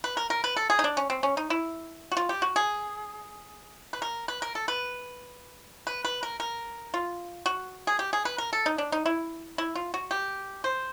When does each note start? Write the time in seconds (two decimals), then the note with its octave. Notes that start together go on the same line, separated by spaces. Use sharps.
0.04 B4
0.17 A#4
0.30 A#4
0.44 B4
0.57 A4
0.70 G#4
0.79 D#4
0.84 D4
0.97 C#4
1.10 C4
1.23 C#4
1.37 D#4
1.50 E4
2.12 F#4
2.17 F4
2.29 G4
2.42 F#4
2.56 G#4
3.93 B4
4.02 A#4
4.28 B4
4.42 A#4
4.55 A4
4.68 B4
5.87 B4
6.05 B4
6.23 A#4
6.40 A#4
6.94 F4
7.46 F#4
7.87 G#4
7.99 G4
8.13 G#4
8.25 B4
8.38 A#4
8.53 A4
8.66 D#4
8.78 D4
8.92 D#4
9.06 E4
9.58 E4
9.75 F4
9.94 F#4
10.11 G4
10.64 C5